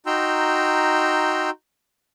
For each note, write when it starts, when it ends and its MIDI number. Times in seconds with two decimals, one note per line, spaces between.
0.06 1.50 63
0.06 1.50 66
0.06 1.50 79
0.06 1.50 82
0.06 1.50 84
0.06 1.50 88